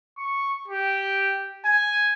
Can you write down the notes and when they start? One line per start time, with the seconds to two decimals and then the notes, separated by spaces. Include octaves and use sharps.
0.18 C#6
0.68 G4
1.65 G#5